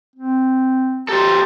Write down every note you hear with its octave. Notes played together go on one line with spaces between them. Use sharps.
C4
G4 A4 C5 A#5